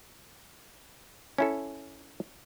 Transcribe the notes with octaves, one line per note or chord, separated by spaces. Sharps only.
C#4 E4 A4